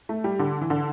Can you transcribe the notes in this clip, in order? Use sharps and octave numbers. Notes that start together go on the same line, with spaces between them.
A3
G3
D3
E3
D3